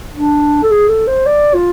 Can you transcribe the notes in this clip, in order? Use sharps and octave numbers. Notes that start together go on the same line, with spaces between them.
D4
A4
G#4
A4
C5
D5
F4